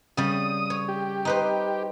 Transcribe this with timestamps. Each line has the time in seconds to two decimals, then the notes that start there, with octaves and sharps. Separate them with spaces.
0.17 C#3 G3 D#6
0.70 C#5
0.88 G4
1.25 D#4 B4 C5